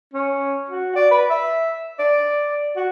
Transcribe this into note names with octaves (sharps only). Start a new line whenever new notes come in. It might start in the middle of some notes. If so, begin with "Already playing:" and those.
C#4
F#4
D5
B4
E5
D5
F#4